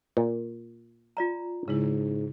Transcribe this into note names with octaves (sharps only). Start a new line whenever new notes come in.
A#2
F4 D5 A#5
G#2 C#3 G#3 E4